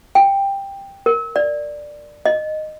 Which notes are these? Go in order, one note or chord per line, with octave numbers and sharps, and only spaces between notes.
G5
A#4
D5
D#5